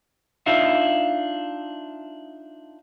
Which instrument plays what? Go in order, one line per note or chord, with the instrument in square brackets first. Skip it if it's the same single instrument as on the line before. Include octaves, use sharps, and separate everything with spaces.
[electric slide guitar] D4 D#4 F4 E5 F5